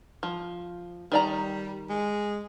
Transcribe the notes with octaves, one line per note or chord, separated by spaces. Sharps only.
F3
D#3 G3 D5 A#5
G#3